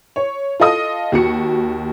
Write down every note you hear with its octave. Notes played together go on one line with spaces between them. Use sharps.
C#5
F4 A4 D#5 D#6
D#2 F#4 C#7